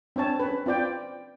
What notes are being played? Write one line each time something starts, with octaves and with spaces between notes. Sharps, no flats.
C4 D4 C#5 A5
C#4 B4
C4 F4 D5 G5